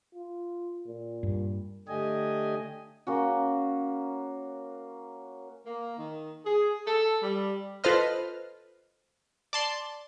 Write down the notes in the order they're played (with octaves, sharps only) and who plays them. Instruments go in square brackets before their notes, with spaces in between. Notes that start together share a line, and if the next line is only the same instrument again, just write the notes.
[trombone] F4
A#2
[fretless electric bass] G2
[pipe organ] D3 A3 D4 G4 D#5 G#5
[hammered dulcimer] A#3 C#4 F#4
[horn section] A#3
D#3
G#4
A4
G3
[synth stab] F4 A4 B4 C5 D#5 F6
D5 A5 C6